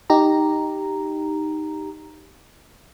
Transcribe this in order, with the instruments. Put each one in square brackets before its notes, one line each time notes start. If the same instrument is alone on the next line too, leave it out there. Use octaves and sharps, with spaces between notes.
[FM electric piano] D#4 G4 A#5